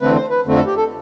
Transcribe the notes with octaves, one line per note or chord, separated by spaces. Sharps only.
E2 D3 A3 C4 B4
C5
B4
F2 D3 A3 C4
A4
G4
A4